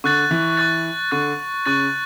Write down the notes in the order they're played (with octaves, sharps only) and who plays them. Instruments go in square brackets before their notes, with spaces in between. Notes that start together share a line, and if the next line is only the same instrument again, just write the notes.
[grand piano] D3 [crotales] C#6 F#6 A6
[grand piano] E3
[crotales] C#6 F#6 A6
[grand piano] D3 [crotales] C#6 F#6 A6
[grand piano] C#3 [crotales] C#6 F#6 A6